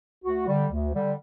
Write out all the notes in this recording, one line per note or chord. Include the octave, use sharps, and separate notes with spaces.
D2 F#4
D3 G3
D2
D3 G3